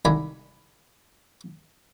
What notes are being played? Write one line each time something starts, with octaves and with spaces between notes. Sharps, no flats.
C2 D3 D#4 G#5 B5 D6